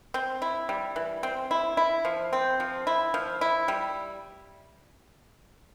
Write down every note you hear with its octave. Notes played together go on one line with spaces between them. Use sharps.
C4
E4
G3
E3
C4
E4
E4
F3
C4
F3
E4
F3
E4
G3